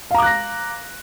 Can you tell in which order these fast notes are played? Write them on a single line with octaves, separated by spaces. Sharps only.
F5 A#5 D6 F#6 A#6